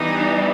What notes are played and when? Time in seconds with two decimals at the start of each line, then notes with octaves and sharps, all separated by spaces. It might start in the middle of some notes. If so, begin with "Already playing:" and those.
Already playing: E3 G3 B3 D4 D#4